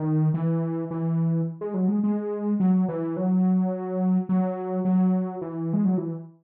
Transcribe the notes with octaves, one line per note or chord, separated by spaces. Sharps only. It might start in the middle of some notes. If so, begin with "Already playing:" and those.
Already playing: D#3
E3
E3
G#3
F#3
G#3
G#3
F#3
E3
F#3
F#3
F#3
E3
G#3
F#3
E3